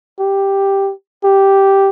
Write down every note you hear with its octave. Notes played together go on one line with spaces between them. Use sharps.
G4
G4